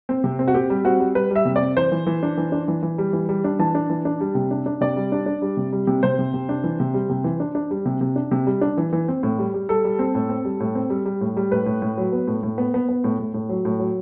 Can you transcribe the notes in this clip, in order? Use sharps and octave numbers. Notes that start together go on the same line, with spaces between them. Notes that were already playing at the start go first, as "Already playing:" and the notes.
C4
C3
C4
F#4
C4 G4
G3
C4 F#4
G3
G3 B4
G3
E5
C3
C4 D5
E3 C5
E3
E3
D4
E3
D4
E3
E3
G3
E3
G3
D4
E3 A5
D4
E3
D4
G3
C3
D4
D4
C3 D5
G3
D4
D4
G3
C3
G3
C3
C3 C5
C3
C3
D4
E3
C3
G3
C3
E3
D4
D4
G3
C3
C3
D4
C3
G3
D4
E3
E3
C4
A2
G3
G3
G3 A4
G3
C4
A2
C4
G3
A2
C4
G3
G3
A2
G3
A2 B4
A2
A2
F#3
B3
A2
A2
B3
B3
B3
A2
A2
A2
F#3
A2
F#3